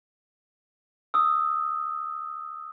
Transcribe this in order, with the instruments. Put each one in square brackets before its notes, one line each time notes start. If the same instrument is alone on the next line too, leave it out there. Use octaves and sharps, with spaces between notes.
[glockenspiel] D#6 E6